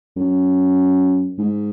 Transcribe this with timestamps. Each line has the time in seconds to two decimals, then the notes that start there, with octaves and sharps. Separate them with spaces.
0.17 F#2
1.39 G#2